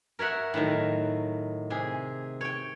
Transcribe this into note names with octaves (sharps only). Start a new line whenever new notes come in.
A#4 C#5 E5 F#5
A2 D#3 F#3
C3 G#4
C#5 G5